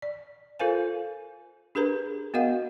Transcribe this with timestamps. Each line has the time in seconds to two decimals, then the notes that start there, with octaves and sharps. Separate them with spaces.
0.02 D5
0.59 F4 A4 A#4 C5 F5 G#5
1.75 D4 G4 G#4 A#4 B4 A#5
2.34 B3 F#4 A#4 D#5 F5 F#5